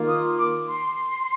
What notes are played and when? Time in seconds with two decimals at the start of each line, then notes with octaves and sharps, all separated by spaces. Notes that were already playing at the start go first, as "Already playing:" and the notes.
Already playing: D#3 A#3 F4
0.08 D#6
0.38 D6
0.68 C6